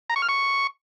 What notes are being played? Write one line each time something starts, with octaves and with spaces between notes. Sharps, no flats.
A#5
C#6
F6
C#6